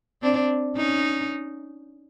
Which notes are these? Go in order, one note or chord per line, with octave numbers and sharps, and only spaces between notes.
C4 D4
C#4 D#4